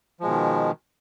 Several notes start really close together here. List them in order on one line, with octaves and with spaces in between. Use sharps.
F3 G#3 B2 D#3